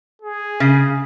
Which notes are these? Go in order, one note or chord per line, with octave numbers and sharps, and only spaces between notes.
G#4
C#3